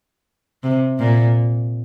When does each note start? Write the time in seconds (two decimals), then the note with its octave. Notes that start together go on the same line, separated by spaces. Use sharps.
0.63 C3
0.99 A#2